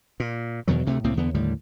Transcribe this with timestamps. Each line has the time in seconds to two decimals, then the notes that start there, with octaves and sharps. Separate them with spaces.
0.20 A#2
0.68 E2 B2 D#3 F#3
0.86 D2 C3 G#3 A3
1.04 C2 A2 A#3 C4
1.17 E2 D3 B3
1.34 D#2 A2 D3 G3